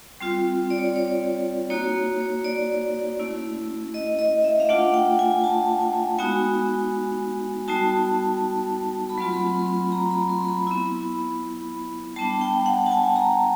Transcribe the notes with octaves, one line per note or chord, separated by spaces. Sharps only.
G3 C4 F4
D5
C#5
D5
C#5
A#3 D#4 F#4 C#5
C#5
D5
A3 C#4 E4
D#5
D#5
E5
F5
A3 D4 F4 F#5
G5
G#5
A5
G#5
G#3 B3 D#4 F#4 G#5
G3 B3 D#4 F#4 A5
B5
F#3 A3 C4 F4 C6
B5
C6
C6
B5
A#5
B5
C6
B5
B3 E4
G3 B3 D4 A5
G5
F#5
A5
G#5
A#5